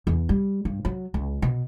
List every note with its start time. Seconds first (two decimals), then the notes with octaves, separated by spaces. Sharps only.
0.07 E2
0.29 G3
0.65 G2
0.85 F#3
1.14 C#2
1.42 B2